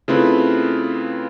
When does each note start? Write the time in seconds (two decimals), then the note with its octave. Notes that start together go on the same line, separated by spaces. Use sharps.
0.08 C#3 A3 C4 E4 F4 B4